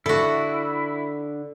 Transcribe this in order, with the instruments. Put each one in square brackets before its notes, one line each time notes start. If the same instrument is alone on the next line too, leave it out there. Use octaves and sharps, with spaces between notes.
[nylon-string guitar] D3 [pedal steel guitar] E4 [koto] F#4 A4